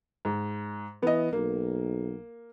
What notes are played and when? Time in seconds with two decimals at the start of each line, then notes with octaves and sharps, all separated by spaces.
0.25 G#2
1.02 E3 B3 D#5
1.33 B1 A#3